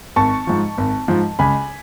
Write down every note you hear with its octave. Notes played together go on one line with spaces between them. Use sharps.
G#1 A5 C#6
G#2 F3
G#1
G#2 F3
C#2 G#5 B5